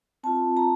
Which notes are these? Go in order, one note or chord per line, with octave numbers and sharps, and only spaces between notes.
C4 F4 A5
A#5